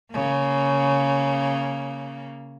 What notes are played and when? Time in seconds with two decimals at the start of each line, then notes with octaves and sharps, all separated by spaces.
0.12 C#3 A#3